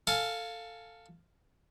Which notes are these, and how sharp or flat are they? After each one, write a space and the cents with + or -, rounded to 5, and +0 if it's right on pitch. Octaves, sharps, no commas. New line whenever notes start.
A4 +15 F5 +0 G#5 +30